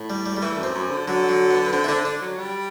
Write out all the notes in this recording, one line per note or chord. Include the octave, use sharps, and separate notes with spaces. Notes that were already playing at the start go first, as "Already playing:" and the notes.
Already playing: A2
G3
G3
G3
E3 A3
F#2
C4
F#2
D3
D3 F#3
F#3
B3
B3
D3 C4
E4
D3 D4
D3 D4
F#3
G3